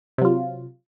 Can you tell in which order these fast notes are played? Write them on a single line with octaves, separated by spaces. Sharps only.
C3 F#3 F4